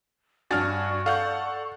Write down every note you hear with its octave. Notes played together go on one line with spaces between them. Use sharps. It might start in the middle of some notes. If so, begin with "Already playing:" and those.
G2 D4 F#4 D5 G#5 C#6 F6 A6
A4 F5 F#5 G6